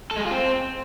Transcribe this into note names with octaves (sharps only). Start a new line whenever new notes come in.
A4
G#3
G#4
F4
C4